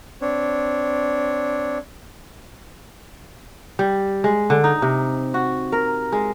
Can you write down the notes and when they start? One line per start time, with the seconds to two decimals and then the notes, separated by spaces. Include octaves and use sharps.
0.21 C4 D4 C#5
3.79 G3
4.24 G#3
4.50 D3
4.64 D#4
4.82 C3
5.34 F#4
5.72 A#4
6.12 G#3